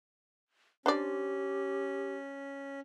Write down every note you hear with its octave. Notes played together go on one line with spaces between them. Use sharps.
C#4 D4 G4 C5 D5